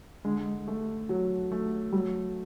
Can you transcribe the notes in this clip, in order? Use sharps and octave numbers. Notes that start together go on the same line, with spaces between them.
D3 G#3
A3
F#3
A3
F#3 G3